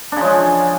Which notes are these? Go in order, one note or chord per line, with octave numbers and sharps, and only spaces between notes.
C#3 F3 G#3 D4